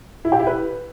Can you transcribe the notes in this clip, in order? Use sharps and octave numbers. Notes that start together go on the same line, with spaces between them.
E4
G4
E4
B4